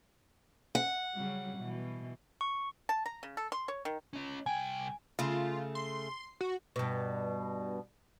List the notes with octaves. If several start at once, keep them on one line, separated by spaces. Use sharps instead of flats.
F#5
C#3 F#3 G3
B2 E3
C#6
A5
A#5
C#3
A4
C6
C#5
D#3
C#4 D#5
C2 G5 G#5
C#3 A3 F4
C6
F#4
G2 B2